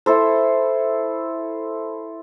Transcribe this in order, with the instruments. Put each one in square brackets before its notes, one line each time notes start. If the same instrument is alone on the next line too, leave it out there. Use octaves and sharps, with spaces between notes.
[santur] E4 A4 C5